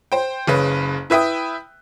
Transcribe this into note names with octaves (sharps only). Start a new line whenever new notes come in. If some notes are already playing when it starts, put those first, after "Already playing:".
C5 G5
F#1 C#3 B4
E4 B4 E5 G5 D#6